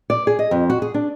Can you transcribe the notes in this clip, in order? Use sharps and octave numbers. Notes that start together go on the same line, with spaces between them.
D5
G#4
D#5
F2
F#4
G#4
D4